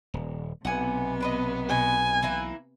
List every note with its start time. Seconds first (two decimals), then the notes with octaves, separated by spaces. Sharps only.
0.14 D#1
0.65 B1 C3 B3 F#5 G#5
1.21 D4 B4 D#5
1.69 B2 D#5 G#5
2.23 E3 A#3 E4